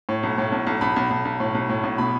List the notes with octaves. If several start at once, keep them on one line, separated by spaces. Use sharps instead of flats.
A2
B1
A2
B1
B1
B1 B5
B1
B1
B1
A2
B1
A2
B1
B2 B5